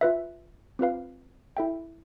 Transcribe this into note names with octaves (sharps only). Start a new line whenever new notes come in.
F4 B4 E5
C4 F4 B4 F5
E4 A4 E5 G5